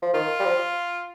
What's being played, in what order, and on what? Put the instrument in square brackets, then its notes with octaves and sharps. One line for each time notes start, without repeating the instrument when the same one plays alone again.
[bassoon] F3
[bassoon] D#3 [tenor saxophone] F4
[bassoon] G3
F3